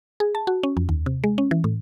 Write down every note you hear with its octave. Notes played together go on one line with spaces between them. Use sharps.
G#4
A5
F#4
C#4
F2
D#2
C3
G#3
C#4
E3
A2